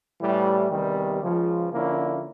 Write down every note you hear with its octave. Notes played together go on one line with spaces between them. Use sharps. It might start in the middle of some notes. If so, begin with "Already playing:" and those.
A2 E3 G3
E2 C3 D#3 G3
C#2 C#3 F3 G#3
D3 F3 A#3 C#4 E4